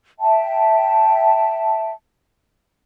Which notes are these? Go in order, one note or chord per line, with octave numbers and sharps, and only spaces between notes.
E5 G5 A5